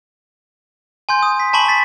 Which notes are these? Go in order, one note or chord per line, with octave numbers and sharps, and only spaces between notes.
G#5 C6 G6
D#6
B6
G#5 A5 B5 C#6 F#7
A6 B6